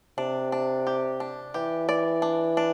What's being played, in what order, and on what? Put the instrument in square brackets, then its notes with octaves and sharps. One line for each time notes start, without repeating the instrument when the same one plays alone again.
[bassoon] C3 [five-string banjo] D4
[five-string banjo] D4
G4
D4
[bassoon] E3 [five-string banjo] G4
[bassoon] E3 [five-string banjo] D5
[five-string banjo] D4
D4